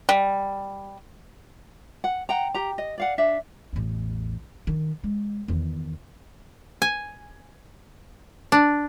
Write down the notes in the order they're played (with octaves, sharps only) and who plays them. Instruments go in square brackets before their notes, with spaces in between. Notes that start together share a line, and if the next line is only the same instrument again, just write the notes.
[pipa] G3
[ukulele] F#5
F#5 G5 A#5
G4 A#5
D#5
D5 F5 F#5
D4 E5 F5
[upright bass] A1 E2
D#3
G#3
E2 D#3
[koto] G#5
D4